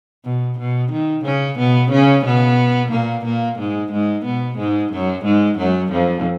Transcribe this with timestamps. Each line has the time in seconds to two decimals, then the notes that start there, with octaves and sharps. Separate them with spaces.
0.24 B2
0.59 B2
0.92 D#3
1.25 C#3 C#4
1.59 B2 B3
1.91 C#3 C#4
2.25 B2 B3
2.91 A#2 A#3
3.25 A#2 A#3
3.59 G#2 G#3
3.92 G#2 G#3
4.25 B2 B3
4.58 G#2 G#3
4.92 F#2 F#3
5.25 G#2 G#3
5.58 F#2 F#3
5.92 F2 F3